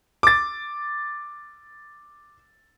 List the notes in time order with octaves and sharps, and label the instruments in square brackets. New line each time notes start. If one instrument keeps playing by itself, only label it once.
[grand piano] D6 A6